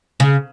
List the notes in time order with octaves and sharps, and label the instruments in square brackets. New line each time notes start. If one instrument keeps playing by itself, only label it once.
[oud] C#3